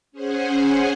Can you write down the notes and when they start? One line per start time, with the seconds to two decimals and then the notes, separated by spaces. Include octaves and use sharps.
0.12 C#4 G#4 C5 F#5 G#5